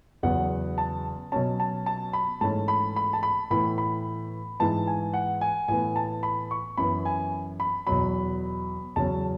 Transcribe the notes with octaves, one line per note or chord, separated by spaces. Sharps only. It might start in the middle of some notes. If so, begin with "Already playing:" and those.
E2 C#3 F#3 B3 F#5
A5
B2 F#3 C#4 A5
A5
A5
B5
G#2 E3 A3 C#4 A5
B5
B5
A5
B5
A2 E3 B3 B5
B5
G#2 E3 B3 A5
G#5
F#5
G#5
A2 E3 B3 G#5
A5
B5
C#6
F#2 E3 B3 B5
G#5
B5
E2 B2 F#3 B5
E2 C#3 F#3 C#4 A5